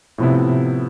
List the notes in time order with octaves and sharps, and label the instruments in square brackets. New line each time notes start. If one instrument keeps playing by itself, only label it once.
[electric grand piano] A2 F3 B3 E4 [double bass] C3